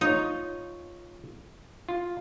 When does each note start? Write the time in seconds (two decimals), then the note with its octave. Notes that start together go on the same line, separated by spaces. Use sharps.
0.01 D#4 F4 C#5
1.89 F4